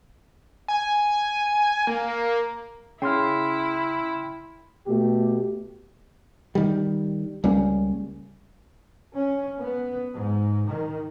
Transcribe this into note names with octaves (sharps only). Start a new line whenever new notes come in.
G#5
A#3
C#3 E4 G5 C6 F6
B2 A3 G4
D#3 G3
C#2 G3 A#3 C#4
C#4
B3
G#2
D#3